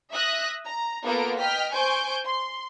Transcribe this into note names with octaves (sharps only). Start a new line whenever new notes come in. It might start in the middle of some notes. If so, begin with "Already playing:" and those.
E5 D#6 F#6 A#6
A#5
A#3 B3 F4 A4 A#4 D7
D#5 G5 F6 B6
C5 G#5 C#6 G6 D7
C6